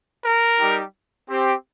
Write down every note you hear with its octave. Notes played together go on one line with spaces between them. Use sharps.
A#4
G3 D#4 G4
C4 G4